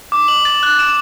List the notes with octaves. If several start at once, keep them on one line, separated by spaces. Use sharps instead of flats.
D6
F#7
A6
F#6
E7